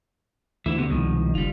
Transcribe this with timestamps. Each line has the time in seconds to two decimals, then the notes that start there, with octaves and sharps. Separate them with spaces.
0.66 D2 E3 E4 E5
0.77 C3 B3
0.90 C2 B2 D#3 F3 G#3
1.35 F#1 G3 F4